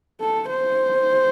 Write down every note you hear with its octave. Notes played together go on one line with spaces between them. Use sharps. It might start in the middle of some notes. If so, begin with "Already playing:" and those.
A4
C5